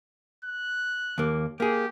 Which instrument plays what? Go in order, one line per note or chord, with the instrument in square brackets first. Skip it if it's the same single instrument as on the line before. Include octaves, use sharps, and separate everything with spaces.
[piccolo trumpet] F#6
[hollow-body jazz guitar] D#2 A#3
[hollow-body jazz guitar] A#3 G#4 [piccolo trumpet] G4